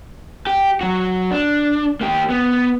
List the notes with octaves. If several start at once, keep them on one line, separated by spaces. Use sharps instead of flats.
G4
F#3 F#4
D4
A#3 G4
B3